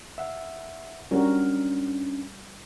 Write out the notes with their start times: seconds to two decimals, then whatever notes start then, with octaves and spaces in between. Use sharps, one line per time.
0.18 E5 F#5
1.11 G3 C#4 D4 F#4 A#4